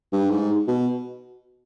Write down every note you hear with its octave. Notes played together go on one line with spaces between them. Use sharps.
G2
G#2
B2